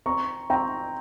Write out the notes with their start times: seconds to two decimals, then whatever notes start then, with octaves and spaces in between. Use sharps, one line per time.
0.06 C4 A#5 C#6
0.50 C4 G5 A#5